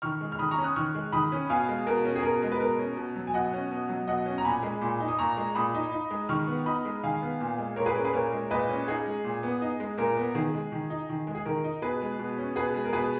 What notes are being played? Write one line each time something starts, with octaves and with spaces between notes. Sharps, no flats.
D#3 C#6 F6
G#3
F6
D#3 B5 D#6
A#5 C#6
C#4
D#6 F#6
D#3 C#6 F6
G#3
D#3 B5 D#6
C#4
B2 F5 G#5
G#3
B2 A#4
C#4
G#4
B2 A#4
G#3
B4
B2 A#4
C#4
B2
F#3
G#5
B2 D#5 F#5
C#4
B2
F#3
B2 D#5 F#5
C#4
A#5
A#2 G#5 B5
G#3
A#2
D#4
D#6
A#2 A#5 C#6
G#3
A#2 B5 D#6
D#4
D#4
G#3
D#3 C#6 F6
B3
D#4 B5 D#6
G#3
D#3 F5 G#5
B3
A#2
G#3
A#2 A#4 C#5
G#4 B4
C#4 A#4
G#4 B4
A#2 A#4 C#5
G#3
A#2 B4 D#5
C#4
D#4 G#4
G#3
A#2
B3
D#4
G#3
A#2 A#4
B3
D#3 G#4
G#3
D#3
D#4
D#3
G#3
G#4
D#3 A#4
D#4
B2 G#4 B4
G#3
B2
C#4
B2 G#4 B4
G#3
A#4
B2 G#4 B4